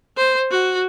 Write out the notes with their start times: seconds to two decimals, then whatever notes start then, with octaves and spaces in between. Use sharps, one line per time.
0.17 C5
0.50 F#4